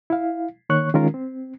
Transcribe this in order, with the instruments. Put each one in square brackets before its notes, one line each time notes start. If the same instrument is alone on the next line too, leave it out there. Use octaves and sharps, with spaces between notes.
[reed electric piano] E4 F5
D#3 A#3 C#5 C#6 F#6
D#3 G#3 C#4 F4 A#4
C4